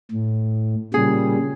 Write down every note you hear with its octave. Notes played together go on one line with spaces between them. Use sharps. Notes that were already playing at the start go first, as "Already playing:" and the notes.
A2
A#2 C#3 G3 G#4